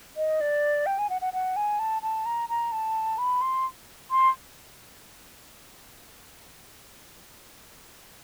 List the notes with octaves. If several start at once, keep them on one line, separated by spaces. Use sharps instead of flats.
D#5
D5
G5
G#5
F#5
F#5
F#5
G#5
A5
A5
A#5
A#5
A5
B5
C6
C6